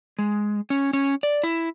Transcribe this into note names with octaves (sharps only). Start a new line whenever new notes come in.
G#3
C#4
C#4
D5
E4